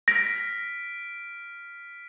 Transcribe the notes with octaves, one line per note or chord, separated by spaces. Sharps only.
F6 A#6 B6 D7